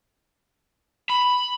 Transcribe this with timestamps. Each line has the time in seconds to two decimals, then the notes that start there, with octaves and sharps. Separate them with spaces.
1.10 B5